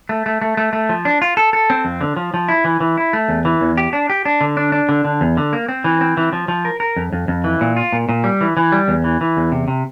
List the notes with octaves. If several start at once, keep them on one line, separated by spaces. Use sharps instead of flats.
A3
A3
A3
A3
A3
F3
D4
F4
A4
A4
C4
F2
D3
F3
F3
E4
E3
E3
E4
A3
E2
E3
E2
G4
D4
G4
D4
D3
D4
D4
D3
D3
E2
D3
A#3
C4
E3
C4
E3
F3
F3
A#4
A#4
F2
F2
F2
E3
A#2
F4
A#2
A#2
G3
E3
E3
G3
E2
E3
E3
E2
C3
C3